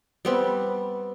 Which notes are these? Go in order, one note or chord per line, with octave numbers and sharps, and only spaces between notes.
G3 B3 C4